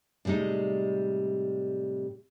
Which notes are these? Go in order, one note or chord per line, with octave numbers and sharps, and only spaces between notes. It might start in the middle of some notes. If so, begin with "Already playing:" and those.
A2 C3 G3 G#3 D#4